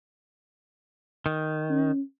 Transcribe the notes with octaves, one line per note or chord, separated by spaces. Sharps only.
D#3
C#4